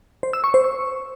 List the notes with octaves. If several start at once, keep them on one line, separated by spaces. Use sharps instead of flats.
C5
E6
C#6
C5
C#6